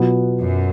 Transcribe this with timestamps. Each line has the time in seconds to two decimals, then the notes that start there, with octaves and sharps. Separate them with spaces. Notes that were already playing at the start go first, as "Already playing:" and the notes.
Already playing: B2 F#3 B3 F4 B4
0.40 F#2